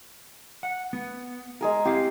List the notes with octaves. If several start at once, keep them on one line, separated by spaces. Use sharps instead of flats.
F#5
B3
G#3 G#4 A#4
C4 E4 G4 F5